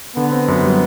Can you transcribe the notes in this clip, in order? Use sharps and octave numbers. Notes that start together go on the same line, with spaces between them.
D3 B3
C4
F#2
G3